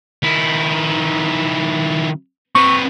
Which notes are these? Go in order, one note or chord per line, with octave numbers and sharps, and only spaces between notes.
D#3 E4
C4 B4 C#6